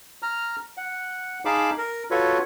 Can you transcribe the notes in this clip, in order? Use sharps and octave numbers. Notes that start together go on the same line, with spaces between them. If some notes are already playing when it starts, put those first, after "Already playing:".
A#5 F6
F#5
D#4 G#4 F5 A5 B5 D6
A#4
F4 F#4 A4 B4 C#5